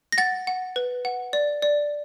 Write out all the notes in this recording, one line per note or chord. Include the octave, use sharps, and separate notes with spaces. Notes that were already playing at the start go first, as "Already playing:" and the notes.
A#6
F#5 A6
F#5
B4
F#5
D5
D5